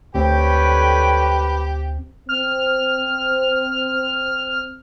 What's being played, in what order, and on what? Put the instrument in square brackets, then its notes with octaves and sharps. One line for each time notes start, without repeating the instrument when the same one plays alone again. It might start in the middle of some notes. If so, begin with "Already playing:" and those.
[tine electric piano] D2 C4 [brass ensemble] D3 C#5 G5 [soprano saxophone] G4 [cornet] B4
[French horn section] C4 [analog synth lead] F6